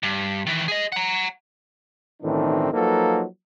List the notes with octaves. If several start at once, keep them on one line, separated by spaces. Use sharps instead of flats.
G2
D#3 E3
G#4 D#5
F#5 A#5
B1 A2 D#3 E3 C4 D4
F3 F#3 A#3 D#4 A4 B4